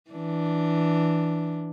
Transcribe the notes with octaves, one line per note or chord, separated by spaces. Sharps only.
E3 D4